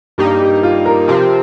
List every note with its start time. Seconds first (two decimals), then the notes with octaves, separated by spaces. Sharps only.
0.18 G2 G3 A#3 D#4 G4
0.40 G4
0.63 F4
0.86 A#4
1.08 C3 F3 C4 G4